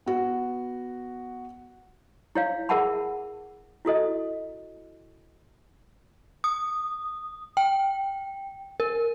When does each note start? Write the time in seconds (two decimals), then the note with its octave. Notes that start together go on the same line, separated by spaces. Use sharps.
0.06 B3 F#4
2.35 E4 C#5 F5
2.69 G#4 A#4 E5 F#5 A5 B5
3.85 E4 F#4 A4 D#5
6.44 D#6
7.57 G5
8.80 A#4